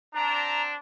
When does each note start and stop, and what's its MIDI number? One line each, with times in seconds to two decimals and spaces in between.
0.15 0.76 60
0.15 0.76 62
0.15 0.62 82